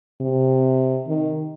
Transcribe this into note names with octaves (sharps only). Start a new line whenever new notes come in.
C3
D#3